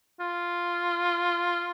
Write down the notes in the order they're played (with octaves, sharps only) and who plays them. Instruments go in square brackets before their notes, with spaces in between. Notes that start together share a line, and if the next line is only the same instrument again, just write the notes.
[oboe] F4